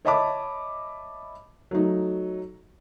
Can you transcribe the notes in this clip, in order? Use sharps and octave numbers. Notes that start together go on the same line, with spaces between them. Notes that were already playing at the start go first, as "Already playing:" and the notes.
C#5 D#5 E5 A5 B5 D6
F#3 A3 D#4